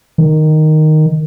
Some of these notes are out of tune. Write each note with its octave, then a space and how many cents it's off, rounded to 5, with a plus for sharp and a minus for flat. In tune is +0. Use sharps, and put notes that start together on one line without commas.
D#3 -5